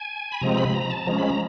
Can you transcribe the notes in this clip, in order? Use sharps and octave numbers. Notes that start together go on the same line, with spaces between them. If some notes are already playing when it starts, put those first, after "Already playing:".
Already playing: G#5
B5
C3 F3 G#3 C4 A#5
B5
A#5
A5
F3 G#3 C#4 A#5
B5
A#5